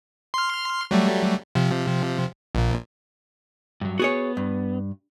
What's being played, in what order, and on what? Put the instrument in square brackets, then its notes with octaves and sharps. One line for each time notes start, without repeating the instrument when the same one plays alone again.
[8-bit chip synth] C6 F6
F#3 G3 A3
C3 F3
A#1 A#2
[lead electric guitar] G2 F#3
[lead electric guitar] B3 [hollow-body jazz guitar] F#4 G#4 C#5
[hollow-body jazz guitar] G2